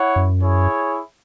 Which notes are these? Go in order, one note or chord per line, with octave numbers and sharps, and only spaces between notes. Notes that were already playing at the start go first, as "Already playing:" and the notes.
Already playing: E4 C#5 F#5
F#2
E4 G#4 C#5